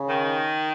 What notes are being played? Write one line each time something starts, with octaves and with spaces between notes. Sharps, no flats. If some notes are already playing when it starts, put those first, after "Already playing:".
Already playing: C#3
D#3